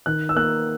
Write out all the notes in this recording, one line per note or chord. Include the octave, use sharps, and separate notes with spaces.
D#3 F#6
E6
A#3 F#6